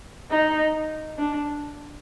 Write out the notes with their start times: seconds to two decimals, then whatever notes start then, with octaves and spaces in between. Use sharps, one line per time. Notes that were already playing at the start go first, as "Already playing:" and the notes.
0.31 D#4
1.18 D4